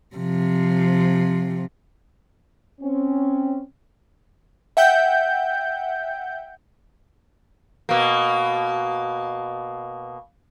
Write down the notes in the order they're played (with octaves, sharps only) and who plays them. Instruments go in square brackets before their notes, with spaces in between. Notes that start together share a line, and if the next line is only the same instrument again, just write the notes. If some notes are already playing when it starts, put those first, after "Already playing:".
[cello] C3 F3
[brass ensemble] C4 C#4
[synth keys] E5 F#5 G5 G6
[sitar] B2 A#3